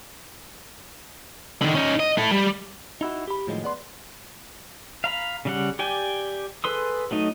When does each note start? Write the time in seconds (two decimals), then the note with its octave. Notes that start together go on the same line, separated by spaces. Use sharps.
1.62 D3 D#3
1.75 C#4 D#4
2.00 D#5
2.18 E4 A4
2.31 G3
3.01 D#4 E4 F#4
3.28 G4 B5
3.47 A2 D#3 F3 F#3 G#3
3.64 B3 D5 C6
5.04 F5 A#5 B5
5.45 C#3 G3 F#5
5.79 G4 D5 G5 G#5
6.64 G#4 A4 B4 C6 D#6
7.11 F#3 A3 D#4 D#5